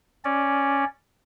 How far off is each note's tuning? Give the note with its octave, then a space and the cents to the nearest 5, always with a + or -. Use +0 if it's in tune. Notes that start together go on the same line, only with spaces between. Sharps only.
C#4 +0 D5 +0